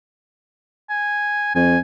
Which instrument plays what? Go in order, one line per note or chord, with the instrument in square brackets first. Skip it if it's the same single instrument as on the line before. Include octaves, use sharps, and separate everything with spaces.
[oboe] G#5
[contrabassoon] F2 [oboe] G#5